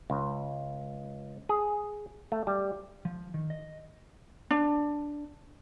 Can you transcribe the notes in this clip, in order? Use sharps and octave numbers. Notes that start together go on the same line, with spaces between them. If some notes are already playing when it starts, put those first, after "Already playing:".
C#2
G#4
A3
G3
F3
D#3
D#5
D4